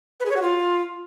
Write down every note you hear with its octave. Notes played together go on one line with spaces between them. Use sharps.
B4
G#4
C#5
F#4
F4